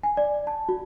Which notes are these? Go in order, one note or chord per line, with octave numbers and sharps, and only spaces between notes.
G#5
D5
A5
F#4